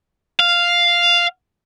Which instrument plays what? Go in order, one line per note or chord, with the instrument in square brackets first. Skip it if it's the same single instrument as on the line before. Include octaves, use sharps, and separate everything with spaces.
[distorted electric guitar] F5